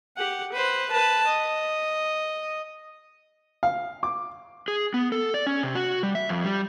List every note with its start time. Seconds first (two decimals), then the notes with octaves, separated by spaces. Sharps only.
0.17 G4 F#5
0.52 B4 C5
0.91 B4 A5
1.27 D#5
3.63 F5
4.03 D6
4.68 G#4
4.94 B3
5.12 A4
5.34 D5
5.47 C#4
5.63 C3
5.75 F#4
6.03 G3
6.15 E5
6.29 F2
6.44 G3